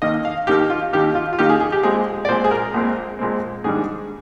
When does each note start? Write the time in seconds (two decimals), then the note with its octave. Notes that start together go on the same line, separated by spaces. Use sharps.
0.02 D#2 D#3 A#3 D#5
0.25 F5
0.47 D#2 D#3 A#3 G4
0.70 F4
0.93 D#2 D#3 A#3 G4
1.15 F4
1.33 F4
1.39 D#2 D#3 A#3 G4
1.50 G#4
1.60 G#4
1.72 G4
1.83 A#1 A#2 G#3 C4 G#4
2.25 D5
2.28 A#1 A#2 G#3 C4 C5
2.44 G#4
2.51 A#4
2.74 A#1 A#2 G#3 C4
3.19 A#1 A#2 G#3 C4
3.64 G#2 D#3 G3 D4 G#4